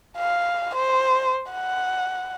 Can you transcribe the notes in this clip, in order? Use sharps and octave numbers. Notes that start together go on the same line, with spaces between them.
F5
C5
F#5